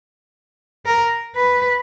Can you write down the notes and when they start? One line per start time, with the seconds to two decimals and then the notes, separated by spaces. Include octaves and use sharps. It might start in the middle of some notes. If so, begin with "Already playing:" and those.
0.86 A#4
1.36 B4